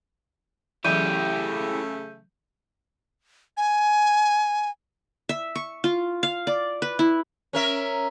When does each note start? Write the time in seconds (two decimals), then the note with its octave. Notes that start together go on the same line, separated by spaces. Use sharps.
0.85 C#3 E3 F#3 A3 E4 G4 G6 D#7
3.57 G#5
5.29 E5
5.55 C#6
5.84 F4
6.23 F5
6.47 D5
6.82 B4
6.99 E4
7.53 C#4 A#4 E5